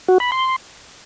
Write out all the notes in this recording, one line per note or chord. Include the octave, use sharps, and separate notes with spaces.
F#4
B5
C6